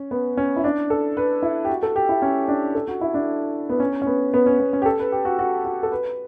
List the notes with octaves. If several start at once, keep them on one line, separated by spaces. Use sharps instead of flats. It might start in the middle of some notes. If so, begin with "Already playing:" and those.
Already playing: C#4
B3
C#4
E4
D4
A4
B4
E4
G4
F#4
A4
G4
E4
C#4
D4
A4
F#4
E4
D4
B3
C#4
C#4
B3
B3
C#4
B3
C#4
G4
A4
B4
G4
F#4
F#4
F#4
A4
B4